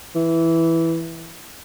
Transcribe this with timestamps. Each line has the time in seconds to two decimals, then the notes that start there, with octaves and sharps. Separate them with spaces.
0.15 E3